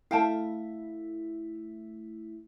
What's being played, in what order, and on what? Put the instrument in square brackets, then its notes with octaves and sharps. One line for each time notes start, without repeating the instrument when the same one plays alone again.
[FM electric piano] A3 E4 [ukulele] F5 G5 A5